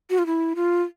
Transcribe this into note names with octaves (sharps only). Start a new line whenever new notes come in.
F#4
F4
E4
F4